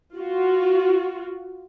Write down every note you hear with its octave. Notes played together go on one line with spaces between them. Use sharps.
F4 F#4